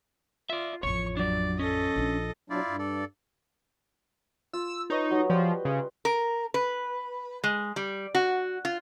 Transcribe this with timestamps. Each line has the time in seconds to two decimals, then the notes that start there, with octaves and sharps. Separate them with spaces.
0.50 F4 D5 E5
0.83 A1 F2 C#5 C#6
1.17 F#3 D4 D5
1.59 C#4 A4 D#5
1.96 A#1 D4
2.50 B2 F#3 D4 E4 F4 D5
2.67 G2
2.79 A4 D5
4.53 F4 E6
4.90 D#4 B4 C#5 D#5
5.11 F#3
5.30 F3 G3 B4 C5
5.65 C#3
6.05 A#4
6.54 B4
7.44 G#3
7.76 G3
8.15 F#4
8.65 F4